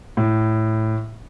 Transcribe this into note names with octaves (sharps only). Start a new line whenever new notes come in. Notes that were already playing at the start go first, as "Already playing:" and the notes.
A2